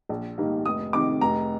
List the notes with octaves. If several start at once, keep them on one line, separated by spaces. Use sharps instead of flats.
A#1
G#2 D#3 G3 A#3
F1 D#6
F2 C3 D#3 D6
F1 A#5